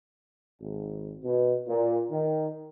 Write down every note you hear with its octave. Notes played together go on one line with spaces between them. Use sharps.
G#1
B2
A#2
D#3